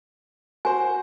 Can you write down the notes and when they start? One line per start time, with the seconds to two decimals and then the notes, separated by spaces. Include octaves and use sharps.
0.65 F#4 C5 G#5